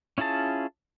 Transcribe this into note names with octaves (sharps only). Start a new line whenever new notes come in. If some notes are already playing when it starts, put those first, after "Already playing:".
C#4 E4 F4 G#4 A5